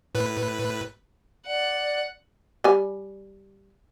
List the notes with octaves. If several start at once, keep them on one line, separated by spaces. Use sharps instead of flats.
A2 B4
D5 F#5
G3 G#5